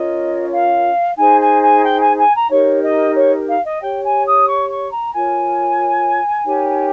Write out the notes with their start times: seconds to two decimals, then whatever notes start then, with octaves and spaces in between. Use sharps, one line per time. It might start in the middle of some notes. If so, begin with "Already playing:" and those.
Already playing: C#4 F4 A#4 C#5 D#5
0.51 F5
1.17 D#4 G#4 C5 G#5
1.40 G#5
1.61 G#5
1.83 G5
2.00 G#5
2.16 G#5
2.33 A#5
2.49 D#4 G4 A#4 C#5
2.82 D#5
3.16 C#5
3.48 F5
3.65 D#5
3.81 G4 C#5 G5
4.03 G#5
4.25 D#6
4.48 C#6
4.70 C#6
4.92 A#5
5.13 F4 A#4 C#5 G#5
6.45 D#4 G4 A#4 C#5